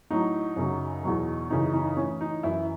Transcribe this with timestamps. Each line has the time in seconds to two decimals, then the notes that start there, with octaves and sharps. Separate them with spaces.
0.10 A2 F#3 D#4
0.56 F#2 C#3 F#3
1.04 E2 B2 F#3
1.50 F#2 C#3 E3 D#4
1.74 D#4
1.97 A2 E3 C#4
2.21 D#4
2.43 F#2 E3 E4